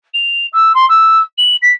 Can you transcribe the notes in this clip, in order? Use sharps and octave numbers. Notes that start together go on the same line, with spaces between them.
F7
E6
C6
E6
F#7
B6